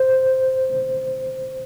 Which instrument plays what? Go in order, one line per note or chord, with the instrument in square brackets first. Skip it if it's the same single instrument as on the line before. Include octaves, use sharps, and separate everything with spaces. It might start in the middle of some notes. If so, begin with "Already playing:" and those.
Already playing: [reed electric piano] C5